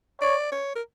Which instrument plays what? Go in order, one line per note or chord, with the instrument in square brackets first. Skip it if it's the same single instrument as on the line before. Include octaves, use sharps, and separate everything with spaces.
[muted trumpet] C#5 [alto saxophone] D5
[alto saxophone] C#5
A#4